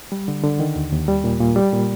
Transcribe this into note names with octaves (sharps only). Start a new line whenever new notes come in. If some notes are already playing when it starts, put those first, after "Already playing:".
G3
D3
D3
D#3
D#2
D#2
G3
A#2
A#2
G3
A#2